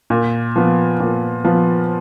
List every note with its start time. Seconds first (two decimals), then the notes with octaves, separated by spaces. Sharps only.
0.10 A#2
0.56 F3 B3
1.00 A#2
1.45 F3 B3